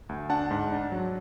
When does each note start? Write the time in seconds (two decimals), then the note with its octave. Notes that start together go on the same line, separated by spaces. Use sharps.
0.09 D2
0.30 D4 F#5 A5
0.51 G#2
0.72 D4
0.92 F#3